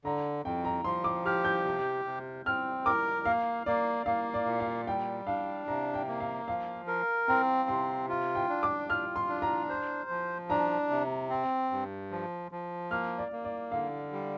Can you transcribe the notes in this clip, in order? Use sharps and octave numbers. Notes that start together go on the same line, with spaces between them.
D3 A#5
F2 G5
A#5
F3 C6
D6
G4 F6
G6
C3
C3
C4 F6
A#4 D6
A#3 F5
A#3 D5
A#3 F5
D5
A#2
F5
G3 G5
D4 F5
C3 A#5
G5
A#3
F5
F3 F5
A#4
C4 A#5
C3 C6
F4
G5
D4
D6
F4 F6
C6
D4
A#5
C5
F3
D4 A#5
C3
C4
G2
F3
F3
A#3 F6
D5
A#3
D5
D3 F5
G3